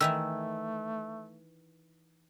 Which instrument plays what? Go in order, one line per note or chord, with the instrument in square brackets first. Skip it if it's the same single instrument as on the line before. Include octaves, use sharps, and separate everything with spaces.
[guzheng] D#3 E3 E4 [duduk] A3 [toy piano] E6